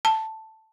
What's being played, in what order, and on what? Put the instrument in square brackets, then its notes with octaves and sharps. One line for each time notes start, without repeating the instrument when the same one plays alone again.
[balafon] A5